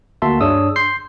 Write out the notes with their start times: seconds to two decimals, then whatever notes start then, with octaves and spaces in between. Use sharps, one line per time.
0.22 D2 A#3 F#4 E5 A5 C6
0.41 G2 D4 G#4 C#5 D#6 E6
0.76 C6 G6 C7